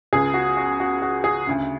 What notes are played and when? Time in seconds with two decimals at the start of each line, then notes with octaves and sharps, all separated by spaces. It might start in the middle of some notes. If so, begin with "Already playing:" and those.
0.13 C#2 C#3 G#4
0.34 F#4
0.57 F#4
0.80 F#4
1.02 F#4
1.24 G#4
1.47 D2 C#3